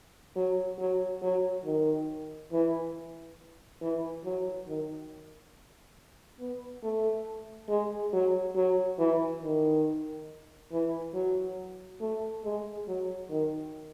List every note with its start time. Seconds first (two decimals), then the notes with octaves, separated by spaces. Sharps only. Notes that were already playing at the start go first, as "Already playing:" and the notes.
0.36 F#3
0.79 F#3
1.22 F#3
1.65 D#3
2.52 E3
3.82 E3
4.25 F#3
4.68 D#3
6.40 B3
6.83 A3
7.69 G#3
8.13 F#3
8.56 F#3
8.99 E3
9.43 D#3
10.72 E3
11.14 F#3
12.01 A3
12.44 G#3
12.88 F#3
13.30 D#3